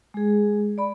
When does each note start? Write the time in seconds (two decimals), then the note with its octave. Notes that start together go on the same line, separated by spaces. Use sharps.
0.14 G#3 G#4
0.78 D5 B5